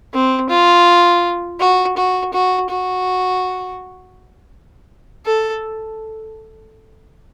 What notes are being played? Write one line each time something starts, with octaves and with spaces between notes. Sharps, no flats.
C4
F4
F#4
F#4
F#4
F#4
A4